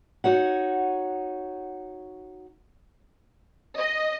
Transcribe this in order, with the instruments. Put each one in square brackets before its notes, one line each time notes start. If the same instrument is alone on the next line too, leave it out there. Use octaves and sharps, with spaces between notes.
[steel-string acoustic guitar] D#4 F#4 C#5 F#5
[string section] D#5